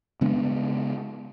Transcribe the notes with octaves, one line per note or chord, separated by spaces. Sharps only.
C#3 G#3 B3 D4